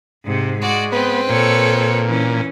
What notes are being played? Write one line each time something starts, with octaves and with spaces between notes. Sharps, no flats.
G#2 C3
G#3 F#4 D5
B3 C4 B4
A#2 A4 C#5
E3 C#4